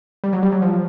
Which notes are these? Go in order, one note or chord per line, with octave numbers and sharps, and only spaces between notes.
G3
F#3
G3
F#3
F3